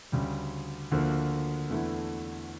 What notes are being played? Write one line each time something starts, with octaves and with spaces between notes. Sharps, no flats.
D2 C#3 G3
D2 D3 F3 A#3
E2 D3 A3 E4